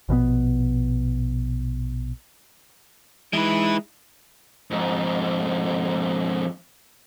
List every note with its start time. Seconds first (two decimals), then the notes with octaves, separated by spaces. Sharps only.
0.09 A#1 B2 D3 B3
3.33 E3 G#3 D#4 E4 B4
4.71 F2 G#2